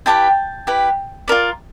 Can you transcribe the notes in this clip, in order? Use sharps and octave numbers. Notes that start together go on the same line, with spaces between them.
E4 G4 B4 G5 A5
E4 G4 B4
F4 A#4 D5